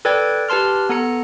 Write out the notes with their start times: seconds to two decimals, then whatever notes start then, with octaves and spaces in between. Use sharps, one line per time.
0.05 A4 B4 D5 G5 G#6
0.49 G4 B4 A5 C6 F6
0.89 B3 A4 A#5 C#7